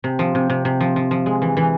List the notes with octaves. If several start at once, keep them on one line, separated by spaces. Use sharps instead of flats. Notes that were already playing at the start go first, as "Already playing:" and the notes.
C3
F3
C3
C3
C3
F3
F3
F3
G#3
E3
E3